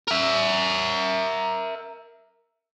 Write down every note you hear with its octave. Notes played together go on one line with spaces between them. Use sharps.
A#4 E5